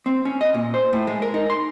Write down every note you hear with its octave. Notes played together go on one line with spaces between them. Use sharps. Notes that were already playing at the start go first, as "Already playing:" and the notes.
C4
C#4
D#5
A#2
C5
A2
G#3
A#4
D#4
C6